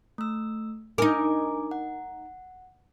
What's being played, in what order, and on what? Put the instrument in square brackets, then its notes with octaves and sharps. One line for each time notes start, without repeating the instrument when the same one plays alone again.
[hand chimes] A3 E6
[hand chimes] D4 G#5 D6 [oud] D#4 A#4
[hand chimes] F#5